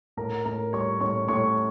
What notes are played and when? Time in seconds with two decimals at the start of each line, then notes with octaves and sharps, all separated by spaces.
0.17 A2 A#4 A#5
0.45 A2 A#4 A#5
0.73 G3 C#5 C#6
1.00 A2 C#5 C#6
1.28 A2 C#5 C#6